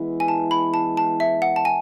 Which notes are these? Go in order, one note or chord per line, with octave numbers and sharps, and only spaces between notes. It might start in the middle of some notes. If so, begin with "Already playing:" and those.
Already playing: E3 G#3 B3 E4
G#5
A5
B5
A5
A5
E5
F#5
A5
G#5